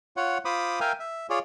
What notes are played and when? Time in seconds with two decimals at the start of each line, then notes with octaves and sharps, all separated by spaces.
0.17 F4 C#5 F#5
0.45 F4 C5 B5 D6 D#6
0.80 A#4 E5 F5 G5 G#5
1.00 E5
1.30 F4 G#4 C#5 D5